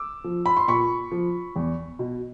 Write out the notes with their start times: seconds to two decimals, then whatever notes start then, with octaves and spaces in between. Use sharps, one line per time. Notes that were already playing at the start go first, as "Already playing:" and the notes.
Already playing: D6 E6
0.24 F3
0.46 B5
0.57 C6
0.68 A#2 B5 C#6
1.12 F3
1.56 E2
1.99 B2